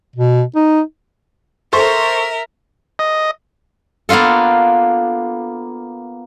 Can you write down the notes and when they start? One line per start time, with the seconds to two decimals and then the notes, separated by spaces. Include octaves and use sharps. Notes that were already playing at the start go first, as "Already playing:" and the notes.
0.16 B2
0.55 D#4
1.73 A4 A#4 C5 E5 C#6
2.99 D#5
4.09 A#3 B3 D4 F4 A4